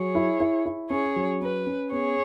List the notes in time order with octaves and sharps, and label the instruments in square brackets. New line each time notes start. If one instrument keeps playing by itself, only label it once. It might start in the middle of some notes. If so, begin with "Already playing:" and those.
Already playing: [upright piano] F#3 [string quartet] G#4 C#5
[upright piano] E4
E4
E4
[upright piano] C#4 [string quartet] G#4 C#5
[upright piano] F#3
[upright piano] C#4 [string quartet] B4
[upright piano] C#4
[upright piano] B3 [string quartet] G#4 C#5